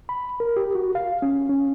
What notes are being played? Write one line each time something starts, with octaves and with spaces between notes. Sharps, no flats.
B5
A#4
G4
F#4
F5
C#4
C#4